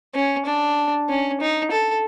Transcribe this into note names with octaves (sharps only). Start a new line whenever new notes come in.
C#4
D4
C#4
D#4
A4